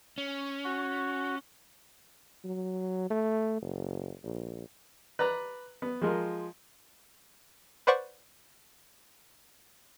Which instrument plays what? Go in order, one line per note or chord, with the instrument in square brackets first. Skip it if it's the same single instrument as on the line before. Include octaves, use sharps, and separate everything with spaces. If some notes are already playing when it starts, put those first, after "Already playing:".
[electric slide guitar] C#4
[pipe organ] F#4
[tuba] F#3
A3
F#1
A#1
[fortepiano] B4 D5 A#5 F#6
B3
F3 G#3 F4 A#4
[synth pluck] B4 C5 D5 F#5 C#6